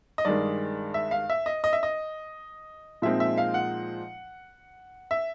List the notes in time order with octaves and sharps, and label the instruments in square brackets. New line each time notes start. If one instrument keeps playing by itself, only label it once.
[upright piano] D#5
G2 D#3 G#3 D5
E5
F5
E5
D#5
D#5
E5
D#5
A#2 F3 G#3 C4 D#4 E5
E5
F5
F#5
E5